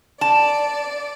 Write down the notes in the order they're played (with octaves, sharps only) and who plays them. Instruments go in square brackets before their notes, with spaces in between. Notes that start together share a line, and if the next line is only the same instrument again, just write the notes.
[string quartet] D5 [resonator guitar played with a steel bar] A5